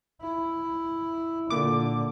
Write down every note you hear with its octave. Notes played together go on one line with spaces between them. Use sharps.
E4
A#2 D3 D6